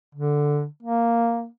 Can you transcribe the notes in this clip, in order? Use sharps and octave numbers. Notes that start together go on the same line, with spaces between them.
D3
A#3